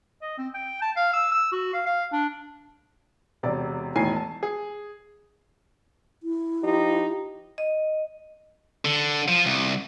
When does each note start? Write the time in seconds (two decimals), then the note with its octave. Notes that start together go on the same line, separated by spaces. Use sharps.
0.22 D#5
0.38 C4
0.54 G5
0.82 A5
0.96 F5
1.13 E6
1.32 E6
1.52 F#4
1.74 F5
1.86 F5
2.13 D4
3.43 E1 C3 D5
3.96 E1 A2 D#3 G#5 C7
4.16 A5
4.43 G#4
6.23 E4
6.63 F3 D#4 G4
7.58 D#5
8.85 D3
9.28 F3
9.46 C2